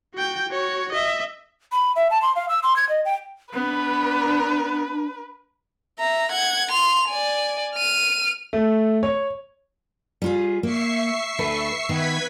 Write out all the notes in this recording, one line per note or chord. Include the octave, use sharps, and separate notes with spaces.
F#4 G5
F#4 C#5
D#5 E5
B5
E5
A5
C6
F5
E6
C6
G#6
D#5
G5
B3 D4 B4
E5 A#5
F#5 G#6
C6 F7
D5 G#5
F6 D#7
A3
C#5
G3 F4 G#4
A#3 E5 C#6 C7
D2 A4 B4
D#3 B3 B4 G#6 B6